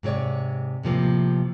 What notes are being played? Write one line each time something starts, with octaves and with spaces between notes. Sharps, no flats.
G#2 C3 F4 C#5 D5
A2 C3 F3 A#3